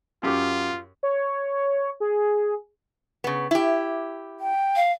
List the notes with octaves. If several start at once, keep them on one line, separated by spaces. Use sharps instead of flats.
F#2 F4 G4
C#5
G#4
C#3 B3
E4 G4
G5
F5